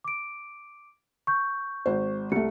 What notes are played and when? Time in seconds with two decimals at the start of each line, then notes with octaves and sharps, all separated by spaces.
0.04 D6 D7
1.27 C#6 G6
1.86 G#1 C5
2.32 C2 A3 C#7